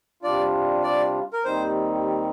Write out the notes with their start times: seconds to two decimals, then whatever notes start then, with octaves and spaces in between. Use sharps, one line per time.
0.23 C3 G3 D4 F4 D5
0.83 D5
1.33 A#4
1.44 D#2 D#3 G3 C4 D#4 C5